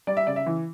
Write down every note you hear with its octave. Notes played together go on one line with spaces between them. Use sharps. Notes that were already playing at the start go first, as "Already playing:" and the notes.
G3 D5
E5
C#3 D5
E5
E3